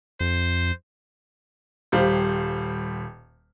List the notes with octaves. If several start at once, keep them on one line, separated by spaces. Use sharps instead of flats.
F2 C5
D#1 G3 C5 F5